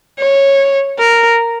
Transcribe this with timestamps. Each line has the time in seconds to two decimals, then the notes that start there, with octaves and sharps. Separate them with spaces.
0.19 C#5
0.99 A#4